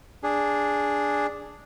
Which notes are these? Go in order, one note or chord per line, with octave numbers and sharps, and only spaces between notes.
D4 G#4